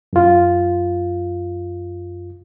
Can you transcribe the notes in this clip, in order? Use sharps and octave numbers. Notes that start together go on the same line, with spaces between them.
F#2 F4